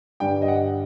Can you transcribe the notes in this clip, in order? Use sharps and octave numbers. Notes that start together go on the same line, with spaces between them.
G2 D3 G3 D4 G5
D#5
F#5